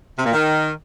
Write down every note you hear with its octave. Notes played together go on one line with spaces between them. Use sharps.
C3
A#2
D#3